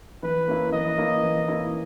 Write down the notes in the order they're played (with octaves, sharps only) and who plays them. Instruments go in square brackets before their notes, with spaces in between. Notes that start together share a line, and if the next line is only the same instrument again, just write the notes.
[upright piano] E3 [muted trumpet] B4
[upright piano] A#3 C#4 E4
[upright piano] E3 [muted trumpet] D#5
[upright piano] A#3 C#4 E4
E3
A#3 C#4 E4